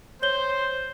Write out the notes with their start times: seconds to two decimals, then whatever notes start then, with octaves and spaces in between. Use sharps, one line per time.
0.22 C5 C#5 G6 G7